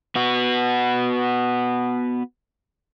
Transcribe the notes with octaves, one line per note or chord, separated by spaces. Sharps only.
B3 F#4